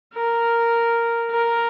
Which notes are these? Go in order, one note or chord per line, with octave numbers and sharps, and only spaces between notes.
A#4
A#4